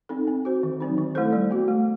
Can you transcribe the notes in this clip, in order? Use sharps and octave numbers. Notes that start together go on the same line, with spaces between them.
C4 D#4 A4
C4
F#4 C5
D#3
F#3 C4 D#4
D#3
A3 E4 A4 C5
G3
B3 F#4
A3